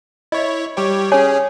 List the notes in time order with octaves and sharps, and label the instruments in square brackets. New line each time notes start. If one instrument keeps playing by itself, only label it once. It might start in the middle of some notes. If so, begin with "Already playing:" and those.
[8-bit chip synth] E4 C#5 [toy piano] D#5
[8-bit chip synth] G3 G4 C#5
[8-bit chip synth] C#4 G#4 [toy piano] C#5 G#5